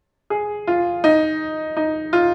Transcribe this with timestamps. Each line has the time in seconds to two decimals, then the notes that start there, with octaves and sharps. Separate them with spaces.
0.30 G#4
0.67 F4
1.04 D#4
1.77 D#4
2.13 F4